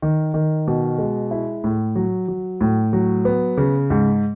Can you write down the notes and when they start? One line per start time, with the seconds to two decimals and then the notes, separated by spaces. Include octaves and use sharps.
0.02 D#3
0.34 D#3
0.67 B2
0.99 G#3
1.31 E4
1.64 A2
1.95 F#3
2.28 F#3
2.61 A2
2.93 F#3
3.25 B3
3.57 C#3
3.90 G#2